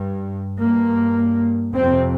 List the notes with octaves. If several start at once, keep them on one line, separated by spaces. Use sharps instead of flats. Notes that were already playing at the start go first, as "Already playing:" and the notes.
Already playing: G2
G2 A#3
F2 C3 C4